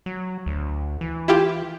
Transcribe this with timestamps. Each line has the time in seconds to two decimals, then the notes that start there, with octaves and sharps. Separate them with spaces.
0.06 F#3
0.46 D2
1.01 E3
1.28 E4 F4 G4